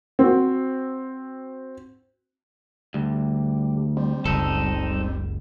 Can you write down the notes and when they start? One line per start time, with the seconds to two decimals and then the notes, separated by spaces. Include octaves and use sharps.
0.19 C4 F#4
2.94 D2 G3
3.97 G3 C4
4.25 F#1 C#2 D#4 A4